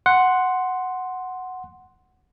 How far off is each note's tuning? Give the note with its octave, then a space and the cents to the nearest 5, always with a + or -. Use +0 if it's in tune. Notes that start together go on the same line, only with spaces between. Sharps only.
F#5 +0 C6 +0